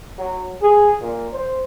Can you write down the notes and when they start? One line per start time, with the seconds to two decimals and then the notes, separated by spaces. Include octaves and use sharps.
0.18 F#3
0.62 G#4
1.01 A#2
1.33 C5